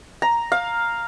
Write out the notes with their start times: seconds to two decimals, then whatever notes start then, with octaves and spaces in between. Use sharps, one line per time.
0.22 A#5
0.52 F5